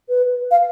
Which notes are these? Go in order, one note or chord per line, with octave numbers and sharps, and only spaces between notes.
B4
F5